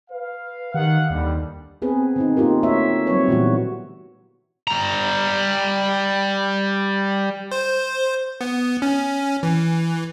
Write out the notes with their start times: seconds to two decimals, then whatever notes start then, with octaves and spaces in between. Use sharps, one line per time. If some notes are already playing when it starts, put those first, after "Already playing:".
0.10 B4 F5
0.74 D#3 G4 F5 F#5
1.10 D#2 D3 G3
1.82 B3 C4 G#4 B4
2.16 D3 C4 D#4
2.37 A#3 D#4 F4 G4 A#4
2.63 A3 F#4 C#5 E5
3.07 F#3 G3 C4 B4 C#5
3.28 A#2 D3 E3 G3 B3 F#4
4.68 G3 A#5
7.51 C5
8.41 B3
8.82 C#4
9.43 E3